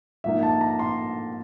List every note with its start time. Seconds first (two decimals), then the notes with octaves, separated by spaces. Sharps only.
0.24 G#2 F3 A#3 D#4 E5
0.43 A5
0.61 A#5
0.79 C6